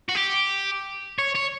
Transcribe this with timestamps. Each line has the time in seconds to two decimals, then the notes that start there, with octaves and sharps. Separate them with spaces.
0.09 F#4
0.15 G4
1.18 C#5
1.35 C#5